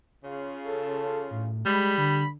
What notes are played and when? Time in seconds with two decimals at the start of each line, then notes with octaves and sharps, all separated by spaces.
0.24 C#3 F4
0.65 A4
1.31 A2
1.66 G3 G#3 B5
1.98 D3